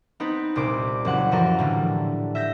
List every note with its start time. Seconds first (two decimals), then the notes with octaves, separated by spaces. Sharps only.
0.20 B3 C4 D#4 B4
0.56 C2 A#2 C5 D6
1.05 F#1 F#3 F#5
1.31 E3 F3 F#4 A4 A#4
1.58 A2 D3 G3
2.35 E5 G6 A#6